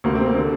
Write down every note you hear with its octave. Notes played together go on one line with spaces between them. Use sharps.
D2 C3 A#3
C4
A#3
D3